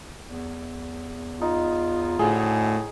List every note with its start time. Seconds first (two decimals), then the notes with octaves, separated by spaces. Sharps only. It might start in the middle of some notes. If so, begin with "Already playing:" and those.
0.25 E2
1.41 D#4 F4
2.19 A2 A3 F#4 G#4